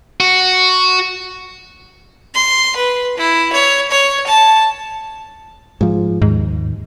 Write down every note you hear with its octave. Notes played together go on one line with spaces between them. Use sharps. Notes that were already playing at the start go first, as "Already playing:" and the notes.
F#4
C6
B4
E4
C#5
C#5
A5
G#2 F3
D#2 G#2